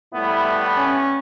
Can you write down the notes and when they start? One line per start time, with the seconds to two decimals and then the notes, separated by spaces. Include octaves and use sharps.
0.14 A2 G3 B3 E4
0.78 C#4